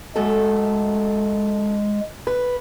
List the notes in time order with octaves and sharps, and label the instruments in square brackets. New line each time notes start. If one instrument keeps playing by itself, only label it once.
[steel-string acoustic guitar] F#2 A3 A4 [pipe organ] G#3
[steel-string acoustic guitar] B4